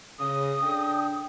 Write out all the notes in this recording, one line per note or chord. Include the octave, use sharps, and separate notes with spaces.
C#3 D#6
D4 A4 G5